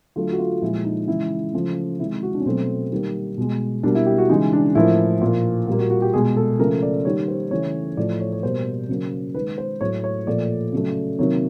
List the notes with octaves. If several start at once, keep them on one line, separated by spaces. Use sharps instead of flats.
D3 F#3 A3 F4
F#4
F4
A#2 F3 G#3 E4
D#4
C#3 E3 G#3 E4
C#3 F3 A3
C3 D#3 G#3 E4
F#4
D4
C#4
B2 F#3 A3 C4
D#3 G3 A#3
B2 G#3
B2 G3 A#3 D4
E4
G4
F#4
C#3 E3 G#3 D#4
D4
A2 F3 A#3 E4
A#2 F3 A#3 F4
A#2 G3 A#3
F#4
F#4
G4
B2 G#3 G#4
A4
C#3 F3 A3 A#4
D5
D#3 G3 A#3 C#5
C5
C#3 E3 A3 C#5
A2 F3 A3 D5
C#5
C#5
B2 G3 A#3 C5
C#3 F#3 A#3
D#3 G#3 B4
C5
A2 F#3 A3 C#5
C#5
A#2 F3 A3 D5
C#3 F#3 A3
C3 D#3 F#3 A#3 C#5